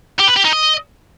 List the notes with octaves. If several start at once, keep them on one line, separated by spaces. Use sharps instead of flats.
G4
B4
G4
D#4
D#5